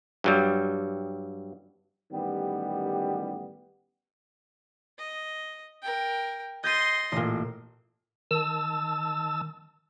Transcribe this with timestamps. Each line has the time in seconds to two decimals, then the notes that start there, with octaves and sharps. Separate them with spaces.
0.24 G2 F#3 G3
2.12 A1 F#2 D#3 G3 B3 G4
4.99 D#5
5.82 A#4 G5
6.64 D#5 C6 G6 A6 D#7
7.12 A1 A#2
8.31 D#3 A5 E6